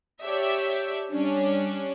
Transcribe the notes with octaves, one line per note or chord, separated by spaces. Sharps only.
G4 C#5 D5 E5 A5
G3 C#4 D4